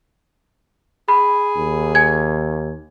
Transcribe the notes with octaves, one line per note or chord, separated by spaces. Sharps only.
G#4 B5
D#2
G#5 G#6